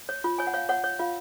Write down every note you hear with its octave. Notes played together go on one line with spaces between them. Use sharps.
C#5
F4
C#5 G#5
F#5
C#5 F5
C#5 F#5
C#5
F4 F5